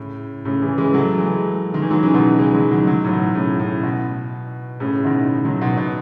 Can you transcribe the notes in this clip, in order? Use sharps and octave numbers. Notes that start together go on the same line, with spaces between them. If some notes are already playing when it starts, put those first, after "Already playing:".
Already playing: A2 C#3
A2 C#3
C#3 E3
E3 G#3
F#3 A3
E3 G#3
D#3
E3
D#3 F#3
C#3 E3
B2 D#3
E3 G#3
D#3 F#3
D#3 F#3
D#3 F#3
A2
B2
A2 C#3
A2 C#3
B2
A2 C#3
B2 D#3
D#3 F#3
B2
B2